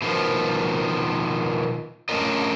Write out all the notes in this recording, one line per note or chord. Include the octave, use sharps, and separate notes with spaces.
B2 D#3 F3
A3 C#4 D4 F4 A#4 D#5